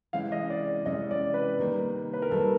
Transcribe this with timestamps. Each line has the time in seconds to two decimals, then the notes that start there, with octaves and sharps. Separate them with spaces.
0.13 C3 E3 G#3 C#4 F5
0.32 D#5
0.50 D5
0.85 C3 E3 G#3 C#4 D#5
1.11 D5
1.34 B4
1.58 C3 D#3 G3 A#3
2.13 B4
2.22 A#4
2.31 C3 D#3 G3 A#3 A4